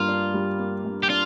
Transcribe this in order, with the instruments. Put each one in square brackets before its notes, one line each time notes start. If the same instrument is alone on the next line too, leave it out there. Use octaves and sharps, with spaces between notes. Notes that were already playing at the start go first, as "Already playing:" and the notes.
Already playing: [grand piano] G2 A#3 [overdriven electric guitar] F4
[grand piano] D4
G3
A#3
G2
[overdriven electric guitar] G4
[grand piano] D4 [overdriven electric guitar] F4